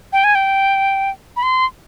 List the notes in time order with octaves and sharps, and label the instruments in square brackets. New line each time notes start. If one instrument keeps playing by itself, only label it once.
[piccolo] G5
G#5
G5
B5
C6